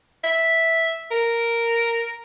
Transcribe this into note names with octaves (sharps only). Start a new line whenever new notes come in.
E5
A#4